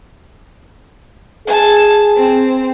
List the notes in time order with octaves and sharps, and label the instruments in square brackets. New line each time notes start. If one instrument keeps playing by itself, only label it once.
[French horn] G#4 [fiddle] G#5 A5
[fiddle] C4